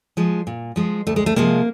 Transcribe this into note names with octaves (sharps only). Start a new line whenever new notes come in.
F3 G#3
A#2
F3 G#3
D2 A3
G#3
A3
C3 F3 G#3 A#3